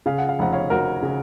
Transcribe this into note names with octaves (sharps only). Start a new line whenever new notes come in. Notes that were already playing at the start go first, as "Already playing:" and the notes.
C#3 F5
F#5
F5
F1 F#5
C#5 F5
F1 F#4 A#4
C#3